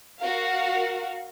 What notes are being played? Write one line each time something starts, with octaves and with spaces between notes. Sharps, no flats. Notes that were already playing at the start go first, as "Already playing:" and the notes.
F#4 A#4 F5